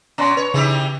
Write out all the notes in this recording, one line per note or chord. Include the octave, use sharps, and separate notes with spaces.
B2 C#4 A#5 C6
B4 C#5 C#6
C#3 E3 D#4 G4